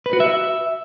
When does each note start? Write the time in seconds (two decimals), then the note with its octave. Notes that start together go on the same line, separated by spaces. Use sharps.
0.06 B4
0.13 F#4
0.20 E5